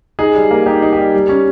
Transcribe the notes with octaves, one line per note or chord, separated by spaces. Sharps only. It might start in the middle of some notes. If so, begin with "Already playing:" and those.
D#4 G#4
G3
A#3
D#4 G4
D#4
G4
G3
G3
C#4